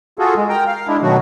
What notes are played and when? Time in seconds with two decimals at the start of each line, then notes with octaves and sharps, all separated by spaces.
0.19 F4 F#4 G#4 A4
0.37 G#3
0.49 A#4 G5 A#5
0.67 F5
0.88 G#3 D4 E4
1.02 B2 D#3 F#3 A3 F#4